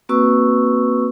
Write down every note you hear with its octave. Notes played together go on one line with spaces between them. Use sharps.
A#3 C4 F#4 B4 C#6 E6